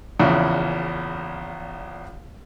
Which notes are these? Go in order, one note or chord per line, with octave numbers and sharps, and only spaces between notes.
A#1 E2 C#3 E3